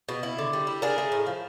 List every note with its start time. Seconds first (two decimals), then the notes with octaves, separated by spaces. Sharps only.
0.09 B2
0.23 E4
0.38 D3
0.53 G3
0.67 E4
0.82 D4 G#4 A#4
0.98 A3
1.12 A2
1.26 F3